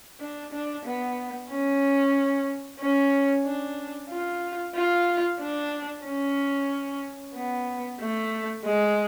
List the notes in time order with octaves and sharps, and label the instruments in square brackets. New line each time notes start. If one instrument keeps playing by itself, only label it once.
[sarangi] D4
D4
B3
C#4
C#4
D4
F4
F4
D4
C#4
B3
A3
G#3